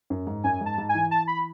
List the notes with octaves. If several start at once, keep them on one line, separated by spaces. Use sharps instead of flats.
F#2
G#2
F#2 G#5
G#2 A5
G#2
G#5
E3
A5
B5